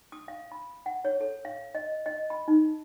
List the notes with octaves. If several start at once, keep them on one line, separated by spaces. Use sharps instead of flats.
D#6
F5
B5
F#5
C#5
A4
F5
D#5
D#5
B5
D#4